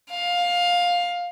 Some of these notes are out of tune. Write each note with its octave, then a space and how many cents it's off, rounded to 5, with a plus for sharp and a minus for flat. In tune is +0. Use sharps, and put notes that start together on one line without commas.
F5 +15